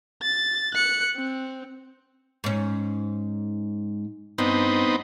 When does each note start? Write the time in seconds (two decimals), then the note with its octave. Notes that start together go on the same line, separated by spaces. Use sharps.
0.22 A6
0.74 F#6 C#7
1.16 C4
2.44 G#2 C#4
4.38 G2 B3 C4 D#4